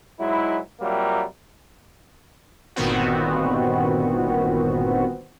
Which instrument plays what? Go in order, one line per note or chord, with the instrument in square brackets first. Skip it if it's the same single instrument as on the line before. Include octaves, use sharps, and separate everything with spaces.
[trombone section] G#2 F#3 G#3 E4
C3 F#3 G3 A#3 F4 A#4
[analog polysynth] G1 A#2 D#3 B3 C4 F#4